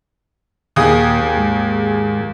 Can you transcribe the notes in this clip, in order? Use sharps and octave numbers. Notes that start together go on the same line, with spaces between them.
D#2 A#2 A#3 G#4 D#6
G#2 G#3